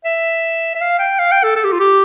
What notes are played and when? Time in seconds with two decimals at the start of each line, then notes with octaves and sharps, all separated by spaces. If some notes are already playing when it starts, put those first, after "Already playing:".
0.05 E5
0.75 E5
0.81 F5
0.99 G5
1.19 F5
1.32 G5
1.44 A4
1.56 A4
1.64 G4
1.72 F4
1.80 G4